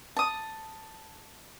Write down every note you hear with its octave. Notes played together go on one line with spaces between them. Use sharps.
A5 D#6